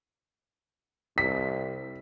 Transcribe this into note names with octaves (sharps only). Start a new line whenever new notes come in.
C2 B6